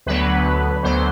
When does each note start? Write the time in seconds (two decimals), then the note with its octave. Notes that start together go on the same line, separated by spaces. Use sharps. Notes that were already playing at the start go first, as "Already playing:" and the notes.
0.06 D2 D3 F#3 B3 B4
0.83 D2 D3 F#3 B3 C5